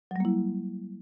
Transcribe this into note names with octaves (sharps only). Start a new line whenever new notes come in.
F#3 G3 A#3 E4